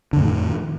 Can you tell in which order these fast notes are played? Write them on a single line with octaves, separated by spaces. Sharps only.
D3 F2 A2 D#3